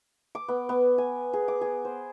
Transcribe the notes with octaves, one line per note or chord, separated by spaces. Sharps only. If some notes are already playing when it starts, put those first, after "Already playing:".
D6
B3
B3
G#5
G#4
D6
G#4
C5